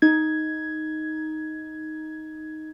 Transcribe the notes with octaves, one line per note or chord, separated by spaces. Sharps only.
D#4 G#6